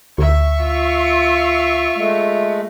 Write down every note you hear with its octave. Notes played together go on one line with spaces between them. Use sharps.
D2 E5 C#6
F4
G#3 A3